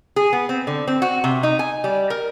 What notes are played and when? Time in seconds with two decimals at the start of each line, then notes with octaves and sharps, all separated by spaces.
0.16 G#4
0.33 B3
0.49 C4
0.67 D3
0.88 C4
1.02 F#4
1.24 C3
1.43 D#4
1.59 G#5
1.84 G3
2.10 A#4